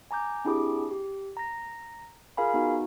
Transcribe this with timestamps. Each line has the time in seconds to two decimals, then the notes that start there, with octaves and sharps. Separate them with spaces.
0.11 G#5 A#5 D6 G6
0.45 C4 D4 E4 G4 G#4 D6
0.91 G4
1.37 A#5 A#6
2.37 F4 G#4 A#4 F5 G#5 B5
2.54 B3 D#4 F#4